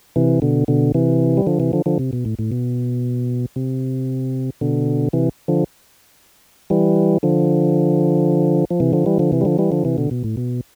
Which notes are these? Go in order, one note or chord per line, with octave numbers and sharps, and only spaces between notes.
C3 E3
B2 D3
B2 D3
C3 E3
G3
D3 F3
C3 E3
D3 F3
D3 F3
C3
B2
A2
A2
B2
C3
B2 D3
C3 E3
D3 F3
E3 G3
D3 F3
F3
C3 E3
D3 F3
E3 G3
D3 F3
C3 E3
G3
D3 F3
E3 G3
D3 F3
C3 E3
B2 D3
B2
A2
B2